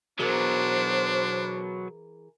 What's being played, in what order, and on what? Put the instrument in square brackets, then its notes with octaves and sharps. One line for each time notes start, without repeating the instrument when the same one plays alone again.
[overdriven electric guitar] B2 F#3 [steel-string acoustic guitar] E3 G#4 A#4 [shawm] D4 [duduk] C5